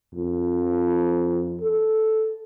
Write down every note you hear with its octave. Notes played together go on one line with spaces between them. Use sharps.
F2
A4